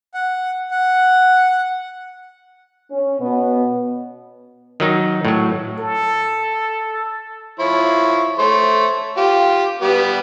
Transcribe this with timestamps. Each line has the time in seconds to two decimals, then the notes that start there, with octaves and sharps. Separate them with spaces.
0.14 F#5
0.71 F#5
2.91 C#4
3.20 B2 B3
4.80 D#3 F#3 D#4
5.25 A2 F#3
5.80 A4
7.59 F3 E4 C#5
8.39 A3 C5 C#5
9.17 F4 G4
9.82 G3 B3 G4